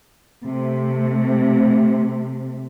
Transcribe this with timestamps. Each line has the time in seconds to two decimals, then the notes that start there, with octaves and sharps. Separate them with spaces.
0.45 C3 A3